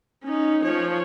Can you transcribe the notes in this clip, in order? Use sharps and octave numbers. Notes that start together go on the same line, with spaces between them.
C#4 D#4
F3 C#5